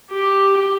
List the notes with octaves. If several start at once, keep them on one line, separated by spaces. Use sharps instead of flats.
G4